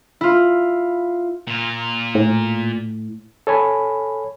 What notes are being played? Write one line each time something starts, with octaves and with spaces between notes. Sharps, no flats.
E4 F4
A#2 F4
A2
A4 C#5 G#5 B5